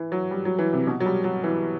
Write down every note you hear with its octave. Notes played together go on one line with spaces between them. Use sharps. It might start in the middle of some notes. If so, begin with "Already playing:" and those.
Already playing: E3
F#3
G3
F#3
E3
C3
B2
F#3
G3
F#3
E3